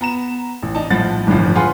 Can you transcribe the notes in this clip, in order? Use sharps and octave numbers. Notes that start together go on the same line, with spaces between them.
B3 A#5 E7
A1
D4 D#4 A5
A#1 A2 F3 F#5 A6
G1 C2 A2 D3 E3 F3
F4 G#4 B4 F#5 G#5 C6